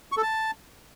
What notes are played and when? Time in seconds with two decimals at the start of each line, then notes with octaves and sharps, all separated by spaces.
0.12 C#6
0.17 A4
0.22 A5